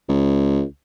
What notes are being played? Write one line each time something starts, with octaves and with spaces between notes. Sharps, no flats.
C#2